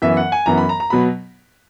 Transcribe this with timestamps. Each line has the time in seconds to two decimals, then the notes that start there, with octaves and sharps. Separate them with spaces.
0.02 F#2 E3 B3 E5
0.17 F#5
0.32 G#5
0.46 F#2 E3 B3 A#5
0.58 B5
0.69 A#5
0.80 A#5
0.90 B2 F#3 B3 B5